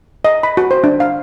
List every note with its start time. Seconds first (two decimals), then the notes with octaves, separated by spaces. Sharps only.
0.25 D#5
0.43 B5
0.57 F#4
0.71 C5
0.84 D4
1.00 F5